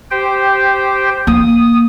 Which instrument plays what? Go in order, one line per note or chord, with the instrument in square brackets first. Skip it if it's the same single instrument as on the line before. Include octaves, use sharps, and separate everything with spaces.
[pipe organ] G4 C5 G5
[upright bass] A#3 [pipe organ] D#6